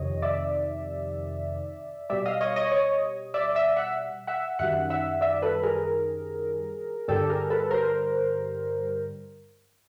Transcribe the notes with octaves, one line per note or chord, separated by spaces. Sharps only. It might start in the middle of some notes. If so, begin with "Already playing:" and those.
Already playing: F2 C3 D#3 C#5 D#5
D5 E5
B2 G3 D5 E5
D#5 F5
C#5 D#5
C#5 D#5
C#5 D#5
D5 E5
D5 E5
E5 F#5
E5 F#5
F#2 D#3 G3 E5 F#5
E5 F#5
D5 E5
A4 B4
G#4 A#4
G2 D3 G3 G4 A4
G#4 A#4
A4 B4
A#4 C5